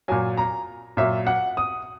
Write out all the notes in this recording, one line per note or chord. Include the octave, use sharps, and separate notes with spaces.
A#2 F#3 G#5
A#5
A#2 F#3 E5
F#5
D#6